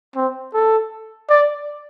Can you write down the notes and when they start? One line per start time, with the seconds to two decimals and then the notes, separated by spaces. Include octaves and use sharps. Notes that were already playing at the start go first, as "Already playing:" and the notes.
0.16 C4
0.54 A4
1.30 D5